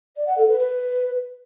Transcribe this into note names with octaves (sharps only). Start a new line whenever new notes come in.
D5
F#5
A4
B4
B4